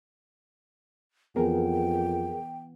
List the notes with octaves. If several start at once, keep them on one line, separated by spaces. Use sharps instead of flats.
F2 E3 B3 G#4 A#4 G5